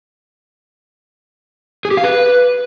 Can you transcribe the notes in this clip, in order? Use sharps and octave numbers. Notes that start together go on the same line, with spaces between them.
G#4
G4
F5
B4